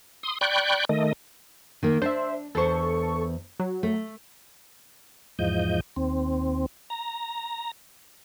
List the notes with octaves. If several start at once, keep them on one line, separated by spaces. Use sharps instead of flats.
C6 D#6
D5 G5 B5 C#6 F#6 G6
D#3 A3 D#5
D#3 A#3
D4 C5 E5
E2 A4 C5 C#6
F#3
A3
E2 G#2 F3 D#5 G6
D#2 C4
A#5